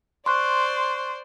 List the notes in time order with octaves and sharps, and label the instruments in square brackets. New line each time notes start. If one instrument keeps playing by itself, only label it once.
[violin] C5 D5 [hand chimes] C6 C#6 F#6